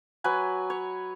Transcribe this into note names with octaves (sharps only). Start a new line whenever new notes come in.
F#3 B4 G#5
C#5